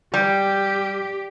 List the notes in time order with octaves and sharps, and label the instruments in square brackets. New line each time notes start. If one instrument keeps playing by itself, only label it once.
[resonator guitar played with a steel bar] G3 [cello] G4